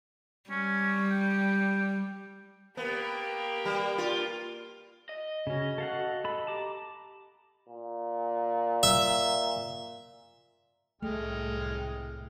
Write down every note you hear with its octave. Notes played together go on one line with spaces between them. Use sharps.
G3 C#4
G5
A#3 B3 G4
G3
F4
D#5
C#3 C#4 F#4
A4 F5 F#5
A4 B5
G4 A5 A#5 D6
A#2
E5
C2 A2 G#3 A3 G5 F6